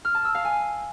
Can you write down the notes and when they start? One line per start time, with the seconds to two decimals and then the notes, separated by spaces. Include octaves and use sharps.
0.05 F6
0.15 A5
0.25 E6
0.35 F5
0.45 G#5